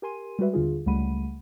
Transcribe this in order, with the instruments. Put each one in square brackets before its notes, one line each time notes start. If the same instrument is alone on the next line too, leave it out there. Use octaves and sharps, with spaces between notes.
[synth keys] G4 A#4 G#5 C6 D#7
G3 G#3 F#4 B4 E5
D#2 D3 F4 G#4
C#2 G3 A3 F#5 B5 D#7